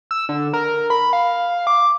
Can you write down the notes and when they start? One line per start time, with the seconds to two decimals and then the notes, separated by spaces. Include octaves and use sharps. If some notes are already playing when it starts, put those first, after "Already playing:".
0.11 E6
0.29 D3
0.53 A#4
0.90 B5
1.13 F5
1.67 D6